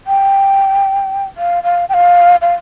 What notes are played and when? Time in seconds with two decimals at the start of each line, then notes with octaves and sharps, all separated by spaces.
0.07 G5
1.38 F5
1.64 F5
1.89 G5
1.94 F5
2.42 F5